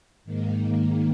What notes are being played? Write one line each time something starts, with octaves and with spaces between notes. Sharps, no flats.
G#2 D#3 A#3